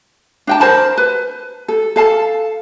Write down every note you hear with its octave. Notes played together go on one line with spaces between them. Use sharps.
D4 G5 A5
A#4 C5 A5 B5
B4
A4
A4 F5 A5